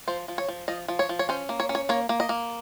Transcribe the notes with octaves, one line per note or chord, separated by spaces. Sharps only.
F3 C5
F3
C#5
F3
F3 D#5
F3
C#5
F3
C#5
C#4 C5
A#3
C#5
C#4
C#5
A#3 C#5
A#3
D#5
A#3